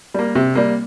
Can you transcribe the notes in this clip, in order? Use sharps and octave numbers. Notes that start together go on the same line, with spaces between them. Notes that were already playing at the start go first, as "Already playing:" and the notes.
G3 A#3
C3
G3 A#3